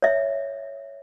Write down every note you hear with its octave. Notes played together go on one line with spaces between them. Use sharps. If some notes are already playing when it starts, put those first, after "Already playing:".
C#5 E5